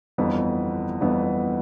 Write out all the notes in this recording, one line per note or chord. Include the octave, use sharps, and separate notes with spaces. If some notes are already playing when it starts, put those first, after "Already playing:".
G1 F2 E3 B3
G1 F2 E3 B3